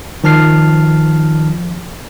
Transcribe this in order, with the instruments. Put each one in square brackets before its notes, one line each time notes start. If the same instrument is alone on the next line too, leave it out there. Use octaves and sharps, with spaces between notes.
[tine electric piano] D#3 F3 A5 F6 C7